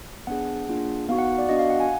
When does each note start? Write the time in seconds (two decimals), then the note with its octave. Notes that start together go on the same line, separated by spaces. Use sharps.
0.27 B3 D4 G#4 F#5
0.69 A#3 D4 F4 G#4
1.09 B3 D#4 F#4 F5
1.19 F#5
1.28 F5
1.38 D5
1.49 B3 D4 F#4 D#5
1.59 F5
1.70 F#5
1.80 G#5